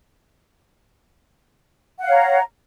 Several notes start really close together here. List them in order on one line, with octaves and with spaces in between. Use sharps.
F#5 F5 C#5 A#5